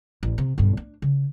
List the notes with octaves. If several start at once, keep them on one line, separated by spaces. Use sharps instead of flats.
A1
C3
B1 G2
D4
C#3